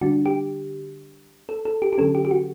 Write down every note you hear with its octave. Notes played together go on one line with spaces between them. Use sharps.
D3 G3 D4 F#4
G4
A4
A4
G4
G4
D3 F#3 C#4 A4
G4
G4
F#4